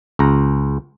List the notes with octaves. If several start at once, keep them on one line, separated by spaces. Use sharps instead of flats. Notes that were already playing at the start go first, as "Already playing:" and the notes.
C#2 A#5